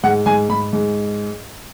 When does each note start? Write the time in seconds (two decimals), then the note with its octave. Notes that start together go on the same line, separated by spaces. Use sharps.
0.03 G#2 F#5
0.26 G#2 G#5
0.49 G#2 B5
0.73 G#2